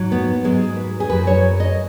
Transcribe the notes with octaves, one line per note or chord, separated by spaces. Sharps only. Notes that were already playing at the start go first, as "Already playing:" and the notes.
Already playing: G#2 F#3
B3
G#2 F#3 G#3
B4
G#4
F#2 F#3 B4
C#5
D#5